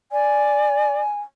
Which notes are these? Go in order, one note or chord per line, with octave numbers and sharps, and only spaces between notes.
D5 G#5